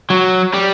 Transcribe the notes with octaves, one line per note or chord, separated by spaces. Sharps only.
F#3
G3